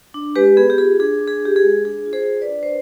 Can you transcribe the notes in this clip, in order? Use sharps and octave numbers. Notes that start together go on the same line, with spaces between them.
D4
G#3 G4 B4
B3 G#4
G4
F4 G#4
D4 G#4
D4
G#4
F4 G4
G#4
G#3
D4 G#4
F4
G#4 C5
F4
B4 D5
D4
C5